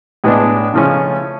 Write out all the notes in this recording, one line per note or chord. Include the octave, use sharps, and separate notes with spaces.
A2 G#3 B3 D4
C#3 F3 A3 C#4